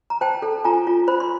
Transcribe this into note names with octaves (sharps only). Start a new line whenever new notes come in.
A#5
C5 G5 A5
A4
F4 G#5 A#5
F4
C5 B5
C6